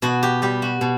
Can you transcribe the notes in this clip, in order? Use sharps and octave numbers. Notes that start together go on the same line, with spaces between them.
B2 F#4
G4
G3 G4
F#4
B2